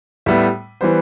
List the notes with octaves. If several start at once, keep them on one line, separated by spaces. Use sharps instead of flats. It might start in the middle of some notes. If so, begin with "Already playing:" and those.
A2 G3 B3 E5
E3 G3 B3 C5